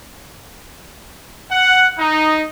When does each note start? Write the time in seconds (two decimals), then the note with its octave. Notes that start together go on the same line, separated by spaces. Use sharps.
1.50 F#5
1.97 D#4